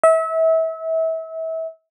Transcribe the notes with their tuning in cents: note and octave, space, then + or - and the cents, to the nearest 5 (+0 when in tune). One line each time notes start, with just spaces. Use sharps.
E5 -30